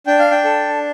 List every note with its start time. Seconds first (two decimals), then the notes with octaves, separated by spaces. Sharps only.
0.07 D4 G5
0.19 F5
0.31 G5
0.44 A4